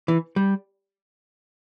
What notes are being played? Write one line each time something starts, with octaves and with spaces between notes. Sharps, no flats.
E3
G3